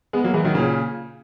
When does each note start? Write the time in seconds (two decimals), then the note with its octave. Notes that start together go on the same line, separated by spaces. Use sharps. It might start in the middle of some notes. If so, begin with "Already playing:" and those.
0.13 G#3 B3
0.24 F#3 A#3
0.34 E3 G#3
0.45 D#3 F#3
0.54 A#2 C#3